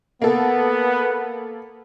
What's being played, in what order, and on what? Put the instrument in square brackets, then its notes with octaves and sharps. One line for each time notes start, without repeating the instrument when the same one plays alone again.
[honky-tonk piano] A#3 A4 [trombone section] B3